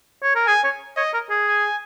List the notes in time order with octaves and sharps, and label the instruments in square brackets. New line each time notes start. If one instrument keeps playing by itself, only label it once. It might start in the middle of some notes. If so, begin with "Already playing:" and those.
[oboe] C#5
A#4
[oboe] G#4 [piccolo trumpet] G#5
[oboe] C#5
[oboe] C#5 [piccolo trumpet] D#5
[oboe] A#4
G#4
[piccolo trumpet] G#5